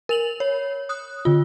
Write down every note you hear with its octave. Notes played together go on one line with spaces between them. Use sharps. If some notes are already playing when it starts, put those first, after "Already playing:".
A#4 F7 F#7
C#5
D#6 F#6
D3 F4